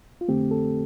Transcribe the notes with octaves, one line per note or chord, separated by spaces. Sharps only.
F4
F2 D3 A3 C4 G4
A4